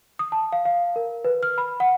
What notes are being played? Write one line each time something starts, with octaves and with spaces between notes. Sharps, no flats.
D#6
A5
F5
F5
A#4
B4
F6
B5
F#5